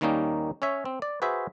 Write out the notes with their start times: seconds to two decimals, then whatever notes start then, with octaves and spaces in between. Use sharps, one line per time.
0.01 D#2 D#3 G3 A#3 C#4 D#4
0.62 C#4 C#5 E5
0.85 C4
1.02 D5
1.22 F#4 G#4 B4 C5 E5